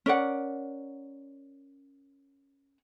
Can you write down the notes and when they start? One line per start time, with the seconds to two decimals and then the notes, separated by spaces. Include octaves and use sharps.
0.06 C#4 A#4 D5 F#5